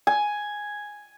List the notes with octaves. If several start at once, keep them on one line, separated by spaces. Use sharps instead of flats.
G#5